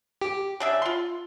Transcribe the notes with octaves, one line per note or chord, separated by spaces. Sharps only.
G4
C#3 D4 E5
F4 C6